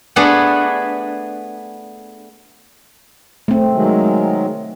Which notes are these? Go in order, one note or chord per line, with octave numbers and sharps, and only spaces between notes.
A3 B3 D4 G#4 B4
A3 C4
D#3 F#3 G#3